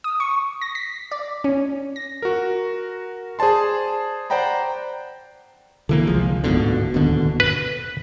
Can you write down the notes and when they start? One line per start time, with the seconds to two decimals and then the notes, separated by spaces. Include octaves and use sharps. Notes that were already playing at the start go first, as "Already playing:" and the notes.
0.04 D#6
0.20 C#6
0.62 A#6
0.75 B6
1.12 D5
1.44 C#4
1.96 A#6
2.22 F#4 A#4
3.39 G#4 C5 D5 A5 C6
4.30 C5 D5 F#5 G5 A#5 B5
5.89 D3 E3 A#3
6.06 C2 F3 G#3
6.44 D1 G#2 B2 D3
6.94 D1 D#2 B2 D3
7.40 B4